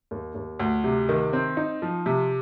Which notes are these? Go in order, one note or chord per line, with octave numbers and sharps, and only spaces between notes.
D#2
D#2
D2
C3
D#3
C4
D#4
F3
C3